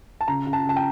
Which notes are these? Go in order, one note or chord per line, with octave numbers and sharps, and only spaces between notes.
A5
C#3 A#5
C#3
A5
C#3 A5
G5